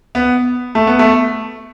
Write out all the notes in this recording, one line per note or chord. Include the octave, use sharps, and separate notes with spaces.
B3
A3
B3
A3